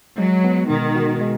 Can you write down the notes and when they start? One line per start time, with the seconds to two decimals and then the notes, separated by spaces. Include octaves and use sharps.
0.18 F#3 G#3
0.44 B3
0.69 B2 D#3
0.96 F#4
1.21 G#3